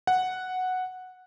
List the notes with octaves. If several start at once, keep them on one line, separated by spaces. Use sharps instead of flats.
F#5